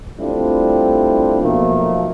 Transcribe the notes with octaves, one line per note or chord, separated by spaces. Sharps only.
G3 A3 C4 D4 E4 F4
B1 B2 F3 A3 A#3